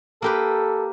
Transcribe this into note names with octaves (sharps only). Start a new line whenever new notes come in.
A#3 G4 A4 B4